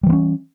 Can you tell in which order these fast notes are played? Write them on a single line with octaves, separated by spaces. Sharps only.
G3 E3 B3 C#4